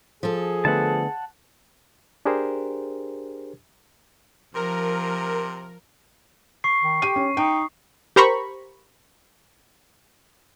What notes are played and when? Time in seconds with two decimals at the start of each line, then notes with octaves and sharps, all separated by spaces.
0.23 F3 G#4 A4
0.65 D3 A3 B3 F#5 A5
2.25 D4 G4 G#4 A#4 C5
4.55 C3 F3 A#4
6.64 C#6 C7
6.82 D#3
7.02 G4 G5 D#7
7.16 C#4
7.37 D#4 G5
8.16 G4 A#4 C5 A#5 B5 C#6